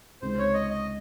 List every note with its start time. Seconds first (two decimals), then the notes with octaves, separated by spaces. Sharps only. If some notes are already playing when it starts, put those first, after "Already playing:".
0.21 C#2 C3 D#3 G#3 C5
0.38 C#5
0.54 D#5
0.70 D#5